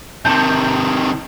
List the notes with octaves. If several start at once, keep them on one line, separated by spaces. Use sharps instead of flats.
C3 D#3 A5 G6